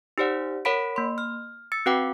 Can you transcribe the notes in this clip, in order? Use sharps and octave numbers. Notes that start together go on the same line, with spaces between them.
D#4 G4 C5 D5 F#5
A#4 C#5 F#5 B5 B6 D7
A#3 C6
F6
E6 A6 C#7
C4 F#4 B4 F#5 G5 D6